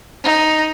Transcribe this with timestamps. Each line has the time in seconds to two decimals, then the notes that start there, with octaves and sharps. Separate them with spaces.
0.23 D#4